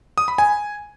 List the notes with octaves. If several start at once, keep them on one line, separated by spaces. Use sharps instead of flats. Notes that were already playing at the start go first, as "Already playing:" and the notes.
D#6
B5
G#5